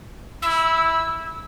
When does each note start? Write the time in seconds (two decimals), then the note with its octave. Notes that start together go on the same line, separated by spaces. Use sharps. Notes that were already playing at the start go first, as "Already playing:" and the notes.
0.42 E4 E6